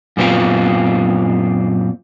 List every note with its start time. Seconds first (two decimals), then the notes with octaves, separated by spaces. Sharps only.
0.17 F#2 A#2 B3 C4 F4